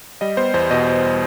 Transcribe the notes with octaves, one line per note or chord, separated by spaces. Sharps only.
G3 D#5
B3 C5
E2 C5
B2 D#5